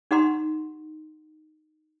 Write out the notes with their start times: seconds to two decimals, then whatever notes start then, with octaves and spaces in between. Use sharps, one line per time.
0.11 D#4 G4 F#5 A#5 C6